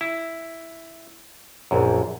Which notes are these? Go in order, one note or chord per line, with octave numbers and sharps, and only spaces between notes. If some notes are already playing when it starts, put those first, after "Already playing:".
E4
A#1 F#2